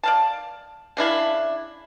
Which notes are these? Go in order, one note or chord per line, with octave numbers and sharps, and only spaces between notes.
D5 F5 A5
C#3 D4 E4 F5